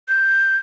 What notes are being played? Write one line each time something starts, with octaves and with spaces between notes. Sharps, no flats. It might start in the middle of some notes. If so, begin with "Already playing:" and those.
G6